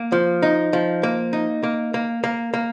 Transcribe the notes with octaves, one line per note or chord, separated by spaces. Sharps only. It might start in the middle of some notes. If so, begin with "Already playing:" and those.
Already playing: A#3
F3
D#4
F3
A#3
D#4
A#3
A#3
A#3
A#3